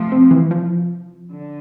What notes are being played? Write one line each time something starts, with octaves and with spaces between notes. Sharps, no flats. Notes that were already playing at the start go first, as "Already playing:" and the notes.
Already playing: C3 F3 A3
C4
E3
F3
D3